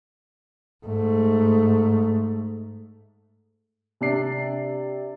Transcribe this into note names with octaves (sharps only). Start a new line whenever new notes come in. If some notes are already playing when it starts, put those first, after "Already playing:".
G#2 A3
C3 D4 D5 C7